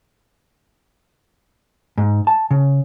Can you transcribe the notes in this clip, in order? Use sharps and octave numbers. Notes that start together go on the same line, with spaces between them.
G#2
A5
C#3